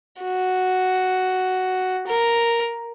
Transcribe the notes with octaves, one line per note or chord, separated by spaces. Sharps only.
F#4
A#4